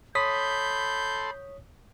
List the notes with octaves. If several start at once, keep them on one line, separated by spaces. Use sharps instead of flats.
A4 C#5 B5 C6 D#6 G6 B6